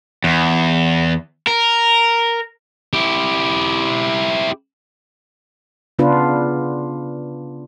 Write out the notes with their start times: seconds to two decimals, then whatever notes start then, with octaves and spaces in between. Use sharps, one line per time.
0.24 E2
1.47 A#4
2.93 E4 G4
5.99 C#3 B3 D4 F4 B4